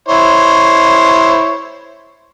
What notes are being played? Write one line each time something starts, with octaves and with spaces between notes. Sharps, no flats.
E4 C5 C#5